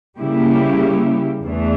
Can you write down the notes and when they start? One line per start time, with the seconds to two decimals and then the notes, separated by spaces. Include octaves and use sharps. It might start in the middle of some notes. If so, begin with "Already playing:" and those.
0.19 C#3 G3 A#3 E4 G4
1.43 E2 E3 A3 D4